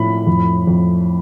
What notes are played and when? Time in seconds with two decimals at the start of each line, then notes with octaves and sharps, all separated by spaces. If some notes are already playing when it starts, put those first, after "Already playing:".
Already playing: A2 F3 B5
0.27 F2
0.67 F2